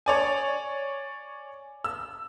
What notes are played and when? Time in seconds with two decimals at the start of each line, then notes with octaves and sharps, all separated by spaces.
0.06 C#5 D5 G#5
1.84 E6